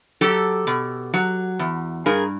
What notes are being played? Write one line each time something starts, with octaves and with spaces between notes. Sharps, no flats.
F#3 G4 A4
B2
F#3
E2
G2 G#4 A#4